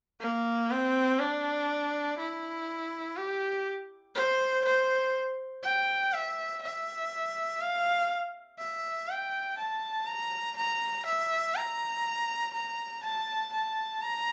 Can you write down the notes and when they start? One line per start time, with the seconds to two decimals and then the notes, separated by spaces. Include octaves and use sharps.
0.21 A#3
0.71 C4
1.20 D4
2.19 E4
3.17 G4
4.15 C5
4.65 C5
5.64 G5
6.13 E5
6.63 E5
7.61 F5
8.59 E5
9.09 G5
9.58 A5
10.07 A#5
10.57 A#5
11.06 E5
11.55 A#5
12.54 A#5
13.03 A5
13.53 A5
14.02 A#5